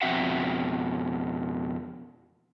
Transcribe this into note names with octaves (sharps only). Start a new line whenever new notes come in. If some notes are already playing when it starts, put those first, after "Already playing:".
F2 B2 C4 F#4 E5 F#5